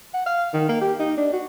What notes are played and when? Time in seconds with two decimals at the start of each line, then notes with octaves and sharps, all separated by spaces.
0.13 F#5
0.26 F5
0.53 D#3
0.69 A#3
0.81 G4
0.99 D#4
1.17 D4
1.33 F#4